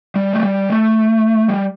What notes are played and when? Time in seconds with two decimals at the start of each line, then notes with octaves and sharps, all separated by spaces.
0.16 G3
0.33 A3
0.43 G3
0.70 A3
1.48 G3